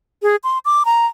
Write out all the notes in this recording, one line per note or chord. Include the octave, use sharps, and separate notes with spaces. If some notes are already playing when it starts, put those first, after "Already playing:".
G#4
C6
D6
A#5